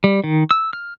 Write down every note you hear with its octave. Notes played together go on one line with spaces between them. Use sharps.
G3
D#3
E6
F6